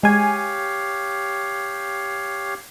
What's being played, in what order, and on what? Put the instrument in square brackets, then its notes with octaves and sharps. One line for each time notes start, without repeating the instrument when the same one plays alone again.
[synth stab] G#3 G#5 [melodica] G4 C#5 F5